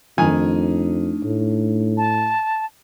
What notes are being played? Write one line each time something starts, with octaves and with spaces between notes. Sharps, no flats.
F2 D#3 A3 D4 D#4 G#5
A2
A5